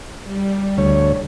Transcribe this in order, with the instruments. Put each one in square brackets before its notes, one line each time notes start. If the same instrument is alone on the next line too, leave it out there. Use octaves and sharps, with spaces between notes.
[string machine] G3
[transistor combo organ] D2 C#5